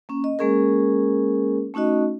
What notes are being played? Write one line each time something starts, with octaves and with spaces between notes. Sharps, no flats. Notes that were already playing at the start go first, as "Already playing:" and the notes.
A#3 C#4
D#5
G#3 A#3 C#4 G#4 A#4
A3 C#4 D#4 F#4 D#5